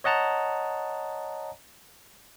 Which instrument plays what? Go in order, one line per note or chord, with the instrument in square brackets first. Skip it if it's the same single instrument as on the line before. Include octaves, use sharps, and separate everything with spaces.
[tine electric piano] C#5 D#5 F#5 A5 A#5